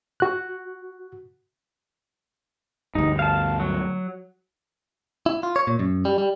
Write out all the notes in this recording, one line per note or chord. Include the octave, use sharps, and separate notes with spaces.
F#4 F#6
D2 G2 D#4
F5 A5
F#3
E4
F4
C#5
A#2
F#2
G3
G3